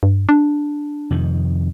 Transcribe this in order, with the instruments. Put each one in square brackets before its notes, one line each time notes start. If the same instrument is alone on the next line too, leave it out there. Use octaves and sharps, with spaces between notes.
[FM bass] G2
D4
[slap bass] F2 C3 D#3